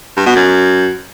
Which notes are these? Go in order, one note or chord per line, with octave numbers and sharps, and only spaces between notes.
G2
B2
F#2